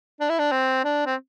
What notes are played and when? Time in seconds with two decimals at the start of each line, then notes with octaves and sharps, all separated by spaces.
0.20 D4
0.29 E4
0.38 D4
0.52 C4
0.84 D4
1.06 C4